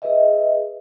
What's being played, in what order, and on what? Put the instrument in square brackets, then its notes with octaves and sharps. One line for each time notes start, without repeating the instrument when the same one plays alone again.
[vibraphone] G#4 B4 D#5 E5